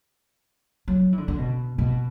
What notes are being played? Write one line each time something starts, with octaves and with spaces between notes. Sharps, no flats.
F#3
E3
D3
D3
B2
B2